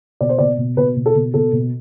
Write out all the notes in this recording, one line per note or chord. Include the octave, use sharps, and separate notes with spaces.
B2 D5
C5
B2 D5
B2
B2 B4
B2
A4
B2
B2 A4
B2